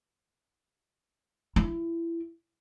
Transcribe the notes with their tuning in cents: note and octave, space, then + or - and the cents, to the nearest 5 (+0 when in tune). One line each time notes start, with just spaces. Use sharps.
E4 +25